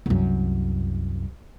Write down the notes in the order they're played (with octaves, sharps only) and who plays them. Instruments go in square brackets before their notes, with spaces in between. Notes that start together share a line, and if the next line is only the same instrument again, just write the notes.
[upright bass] C2 F#2